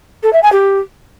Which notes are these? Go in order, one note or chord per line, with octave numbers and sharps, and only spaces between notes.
A4
E5
G#5
G4